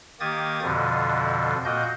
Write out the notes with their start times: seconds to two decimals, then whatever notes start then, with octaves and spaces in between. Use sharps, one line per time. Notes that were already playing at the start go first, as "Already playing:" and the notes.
0.20 D#3 A#3 G4 D#6 G#6 A6
0.62 F2 B2 D3 F3
1.65 A#2 A#3 F#4 D#5 G6